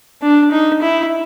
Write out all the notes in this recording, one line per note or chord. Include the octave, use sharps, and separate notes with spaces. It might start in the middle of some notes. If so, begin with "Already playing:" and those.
D4
D#4
E4